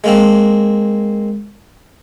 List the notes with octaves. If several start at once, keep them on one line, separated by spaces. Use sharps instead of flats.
G#3 A#3 C4